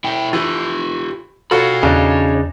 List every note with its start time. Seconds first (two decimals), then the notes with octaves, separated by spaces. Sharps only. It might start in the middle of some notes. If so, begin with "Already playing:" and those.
0.04 E4 G5
0.33 E3 F4 G4
1.51 F4 F#4 A4 C#5 B5
1.83 E2 C#3 D4 D#4